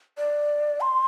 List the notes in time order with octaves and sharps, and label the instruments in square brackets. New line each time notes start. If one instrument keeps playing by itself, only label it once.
[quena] D5
C6